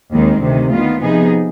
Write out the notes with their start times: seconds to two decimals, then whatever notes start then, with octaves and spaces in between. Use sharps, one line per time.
0.13 D#2 D#3 G#3 C4
0.42 D2 C3 D#3
0.72 D#3 B3 F4
1.02 C3 F3 B3 D#4 G#4